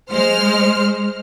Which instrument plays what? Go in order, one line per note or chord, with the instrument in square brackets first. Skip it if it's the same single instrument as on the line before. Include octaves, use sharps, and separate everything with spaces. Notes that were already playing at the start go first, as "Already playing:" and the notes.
[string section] G#3 C5 F6